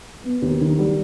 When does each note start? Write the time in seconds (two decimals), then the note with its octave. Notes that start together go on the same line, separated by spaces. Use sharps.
0.24 B3
0.42 D#2
0.61 D#3
0.79 G3